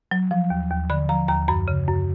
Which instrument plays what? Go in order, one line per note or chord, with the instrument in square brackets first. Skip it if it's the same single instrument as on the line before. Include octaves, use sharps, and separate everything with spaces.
[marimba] F#3
F3
D#2
D#2
D3 B5
F3 A#5
D#2 A#5
F#2 B5
C#3
F#2